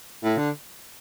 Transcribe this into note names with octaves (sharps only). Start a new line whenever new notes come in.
A2
D3